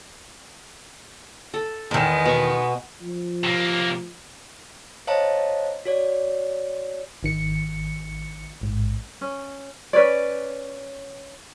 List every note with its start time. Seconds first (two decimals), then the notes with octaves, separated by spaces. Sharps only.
1.54 A4
1.91 E2 D#3 G#3 B3
2.26 B2 C#6
3.02 F3
3.44 C3 A#3
5.07 C5 C#5 D#5 F5 A5 A#5
5.85 F#4 C#5 D5
7.23 G#1 D#3 C#7
8.61 A1 G#2
9.21 C#4
9.93 C#4 B4 C#5 D5